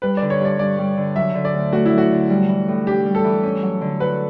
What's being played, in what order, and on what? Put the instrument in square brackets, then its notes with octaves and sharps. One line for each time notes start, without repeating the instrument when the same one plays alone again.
[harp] G3 [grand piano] B4
[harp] D3 [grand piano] D5
[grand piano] C#5
[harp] G2 [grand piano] D5
[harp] G2 [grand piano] D5
[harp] G3
D3
[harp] F#3 [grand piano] E5
[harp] D3
[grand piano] D5
[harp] D2
[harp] A3 [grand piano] F#4
[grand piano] E4
[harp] F#3
[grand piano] F#4
[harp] D3
G3
E3
A2
[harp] D4 [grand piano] G4
[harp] G3
[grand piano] A4
[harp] E3
C#4
F#3
D3
[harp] F#4 [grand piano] B4